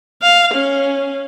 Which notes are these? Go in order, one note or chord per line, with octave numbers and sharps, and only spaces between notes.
F5
C#4